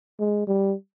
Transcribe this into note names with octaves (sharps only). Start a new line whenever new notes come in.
G#3
G3